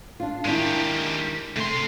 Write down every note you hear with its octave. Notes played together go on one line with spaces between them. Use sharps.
D4 F4
D#3 G#3 D4 E4 G4
C3 A3 C6